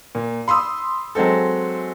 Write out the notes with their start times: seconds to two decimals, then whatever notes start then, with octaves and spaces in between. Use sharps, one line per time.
0.15 A#2
0.48 B5 C6 D#6 E6
1.15 F#3 G#3 C4 A4